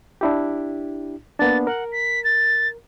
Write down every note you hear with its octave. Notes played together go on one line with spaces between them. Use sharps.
D4 E4 G4
A#3 B3 D4 A6
A#4 F#5
B6
A6